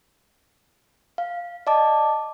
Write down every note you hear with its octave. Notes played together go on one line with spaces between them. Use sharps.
F5
D5 D#5 A5 D6